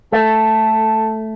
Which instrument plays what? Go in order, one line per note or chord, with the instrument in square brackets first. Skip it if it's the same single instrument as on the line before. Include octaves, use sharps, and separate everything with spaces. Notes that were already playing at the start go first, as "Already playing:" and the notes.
[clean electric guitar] A3 [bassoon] A4